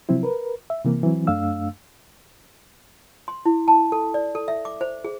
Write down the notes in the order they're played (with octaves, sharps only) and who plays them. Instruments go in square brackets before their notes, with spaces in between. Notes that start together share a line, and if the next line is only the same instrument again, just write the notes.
[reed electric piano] C3 F3 F#3 C4 E4
A#4 B4
E5
C3 E3 A#3
E3 F#3 C4
F#2 A3 D4 F5 E6
[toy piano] C6
E4
A5
A4
D5
A4
E5
D6
C5
G#4